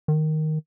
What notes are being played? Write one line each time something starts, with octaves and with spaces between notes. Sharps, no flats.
D#3